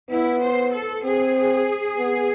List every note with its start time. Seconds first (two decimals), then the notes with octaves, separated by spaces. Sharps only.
0.10 B3 E4
0.42 C5
0.74 A4
1.04 C4 G#4
1.98 B3